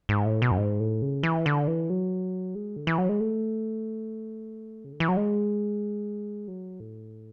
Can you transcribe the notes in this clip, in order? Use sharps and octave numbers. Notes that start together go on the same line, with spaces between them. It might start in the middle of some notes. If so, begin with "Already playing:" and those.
G#2
A2
B2
F#2
G#2
A2
C#3
E3
D3
E3
F#3
G#3
D3
E3
F#3
G#3
A3
C#3
D3
E3
F#3
G#3
F#3
A2